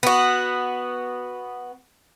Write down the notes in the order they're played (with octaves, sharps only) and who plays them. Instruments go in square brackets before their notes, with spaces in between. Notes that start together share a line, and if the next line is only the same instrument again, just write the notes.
[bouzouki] B3 F#4